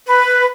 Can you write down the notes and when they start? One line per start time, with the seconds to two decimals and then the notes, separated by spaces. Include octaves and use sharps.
0.07 B4